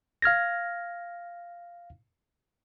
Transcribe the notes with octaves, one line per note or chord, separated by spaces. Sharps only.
F5 F6 G#6 A#6